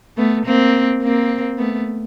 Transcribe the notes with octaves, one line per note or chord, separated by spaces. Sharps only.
A3 B3
A#3 C4
A#3 C4
A3 B3